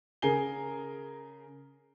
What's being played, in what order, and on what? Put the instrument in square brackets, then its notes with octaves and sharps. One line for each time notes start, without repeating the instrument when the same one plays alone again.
[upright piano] C#3 G#4 A#4 G#5 C7 G7